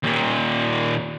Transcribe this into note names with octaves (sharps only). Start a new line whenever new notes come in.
D#2 A#2